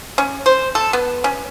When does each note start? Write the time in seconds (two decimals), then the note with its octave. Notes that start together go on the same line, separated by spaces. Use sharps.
0.18 C#4
0.46 C5
0.75 A4
0.93 B3
1.24 C#4